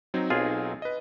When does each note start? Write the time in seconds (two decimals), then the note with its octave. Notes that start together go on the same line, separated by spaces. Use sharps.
0.14 F#3 C4 D#4
0.30 B1 F4 G#4
0.82 B4 D#5